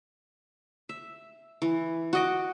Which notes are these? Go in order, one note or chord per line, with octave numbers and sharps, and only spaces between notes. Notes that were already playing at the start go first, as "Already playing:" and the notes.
E5
E3
F#4 D#5 D6